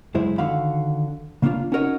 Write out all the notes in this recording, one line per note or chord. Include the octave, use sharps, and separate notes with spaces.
C#2 F#2 G#3 E4 C5
D3 D#3 F#4 F5 B5
C#3 A#3 C#4 D4 F4
C#4 D#4 F#4 A#4 C#5 D#5